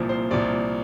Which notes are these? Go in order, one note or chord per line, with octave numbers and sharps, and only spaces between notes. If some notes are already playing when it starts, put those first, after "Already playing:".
Already playing: C2 A#2 F3
C5
C2 A#2 F3 D5